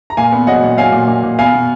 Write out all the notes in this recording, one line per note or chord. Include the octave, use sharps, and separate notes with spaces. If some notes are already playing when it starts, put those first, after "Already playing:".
A#5
A#2 F5 G#5
B3
F#3 D#5 F#5
A#2
F#3 F5 G#5
A#2
A#2
A#2
B3 F5 G#5
B2